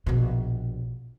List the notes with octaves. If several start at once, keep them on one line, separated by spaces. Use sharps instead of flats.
A#1 B2